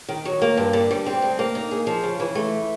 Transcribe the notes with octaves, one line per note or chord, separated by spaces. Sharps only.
D#3
F#3
A#3
G2
D3
G3
C4
D2
A#3
D#4
G#4
F3
C#3
E3
A3